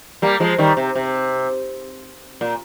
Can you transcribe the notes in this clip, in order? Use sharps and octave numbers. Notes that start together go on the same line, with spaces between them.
G3 A#3
F3 G#3
D#3 G3
C3
C3
A#2